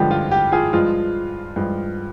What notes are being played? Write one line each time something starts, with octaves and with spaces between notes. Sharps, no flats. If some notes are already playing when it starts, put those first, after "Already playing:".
Already playing: G2 D3 F3 G#3 G4
F4
G4
F4 G#4
G2 F3 G#3 F4
G2 F3 G#3